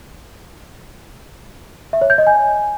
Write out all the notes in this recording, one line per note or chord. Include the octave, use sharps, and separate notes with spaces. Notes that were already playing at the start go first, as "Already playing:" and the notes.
E5
C#5
G6
D#5
G#5